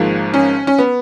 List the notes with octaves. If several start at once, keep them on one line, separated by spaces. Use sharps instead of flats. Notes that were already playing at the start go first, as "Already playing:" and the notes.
Already playing: G#1 G#2 F3 A#3
C#4
C#4
B3